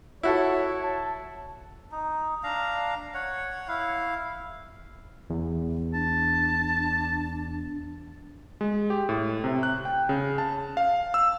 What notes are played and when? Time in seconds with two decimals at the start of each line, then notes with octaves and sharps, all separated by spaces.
0.23 E4 F#4 A4 C#5
0.83 A5
1.92 D#4
2.43 D4 F5 A#5
3.14 C#5 F#5
3.68 E4 F5
5.30 E2
5.94 D4 A5
8.61 G#3
8.90 G4
9.09 A2
9.44 C3
9.63 F#6
9.85 G5
10.09 C#3
10.38 A5
10.77 F5
11.14 E6